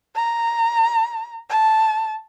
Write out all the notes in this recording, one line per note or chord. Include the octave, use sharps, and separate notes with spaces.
A#5
A5